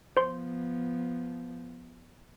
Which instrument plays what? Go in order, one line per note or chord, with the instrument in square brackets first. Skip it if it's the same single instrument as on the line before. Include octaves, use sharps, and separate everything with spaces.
[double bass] F3 B3 [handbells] C5 C6